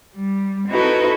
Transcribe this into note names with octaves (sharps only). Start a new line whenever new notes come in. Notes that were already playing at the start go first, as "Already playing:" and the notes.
G3
C4 D#4 E4 F#4 A4 B4